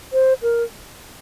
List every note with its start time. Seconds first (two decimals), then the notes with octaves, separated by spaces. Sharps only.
0.13 C5
0.42 A#4